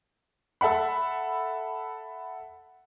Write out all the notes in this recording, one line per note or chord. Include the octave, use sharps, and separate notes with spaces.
A4 E5 F#5 B5